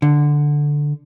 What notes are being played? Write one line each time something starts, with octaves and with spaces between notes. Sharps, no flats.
D3